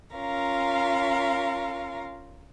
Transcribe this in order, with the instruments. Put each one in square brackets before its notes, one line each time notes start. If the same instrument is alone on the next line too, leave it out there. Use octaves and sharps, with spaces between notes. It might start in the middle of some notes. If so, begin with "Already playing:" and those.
[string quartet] C#4 F4 A#4 F5 A#5